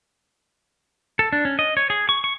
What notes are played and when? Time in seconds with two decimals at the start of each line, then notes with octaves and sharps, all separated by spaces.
1.19 A4
1.33 D4
1.45 C#4
1.59 D#5
1.77 C#5
1.90 G#4
2.09 C#6
2.24 C#6